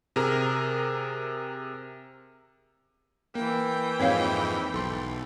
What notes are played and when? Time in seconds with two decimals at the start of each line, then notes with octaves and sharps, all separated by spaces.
0.16 C3 G#4 A#4 A#5
3.35 E3 A#3 G5
4.00 F2 G#2 C4 C#5 F5
4.74 B1 A4 C6